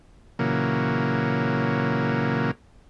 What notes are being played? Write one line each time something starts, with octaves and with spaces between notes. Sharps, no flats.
A#2 C#3 E3 F#3 A#3